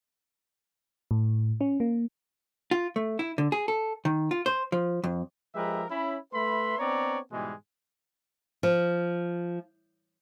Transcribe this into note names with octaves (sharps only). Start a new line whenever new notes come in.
A2
C#4
A#3
F4
A3
E4
D3
G#4
A4
D#3
F4
C5
F3
F2
F3 G#3 G4 A#4 B4 E5
C#4 E4 B5
A3 B4 E5 B5 C6
B3 C4 D4 C#5 D5 A#5
G#2 B2 E3 G3 G#3
F3